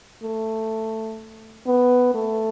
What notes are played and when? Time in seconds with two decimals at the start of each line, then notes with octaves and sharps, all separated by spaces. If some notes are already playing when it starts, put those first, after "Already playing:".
0.23 A3
1.66 B3
2.14 A3